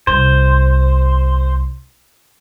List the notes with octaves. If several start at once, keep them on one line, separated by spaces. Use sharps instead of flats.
C2 C5